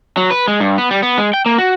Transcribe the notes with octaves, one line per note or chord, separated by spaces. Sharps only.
F#3
B4
G#3
G2
B3
G3
B3
G#3
G5
A#3
F#4